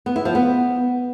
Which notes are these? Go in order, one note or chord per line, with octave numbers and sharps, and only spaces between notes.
B3
E4
F3
B3